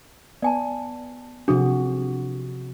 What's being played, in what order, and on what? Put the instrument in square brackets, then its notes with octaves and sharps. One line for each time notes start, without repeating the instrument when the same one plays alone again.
[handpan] B3 [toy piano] D5 G#5 A5
[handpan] C3 F3 F#4 [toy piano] D4 G#4 A4